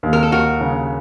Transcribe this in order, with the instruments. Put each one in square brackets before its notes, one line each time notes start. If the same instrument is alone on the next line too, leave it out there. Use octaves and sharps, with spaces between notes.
[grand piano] D#2
[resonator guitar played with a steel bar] A#4
A4
[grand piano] D#2 [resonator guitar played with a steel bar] F#4 A#4
[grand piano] C#3